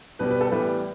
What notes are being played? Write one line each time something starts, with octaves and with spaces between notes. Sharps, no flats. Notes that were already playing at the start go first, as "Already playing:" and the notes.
B2 G3 B3 B4
B4
A4
A2 E3 G3 B3 B4